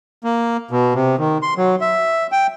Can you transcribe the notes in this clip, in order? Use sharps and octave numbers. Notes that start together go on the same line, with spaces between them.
A#3
B2
C3
D#3
C6
F#3
E5
G5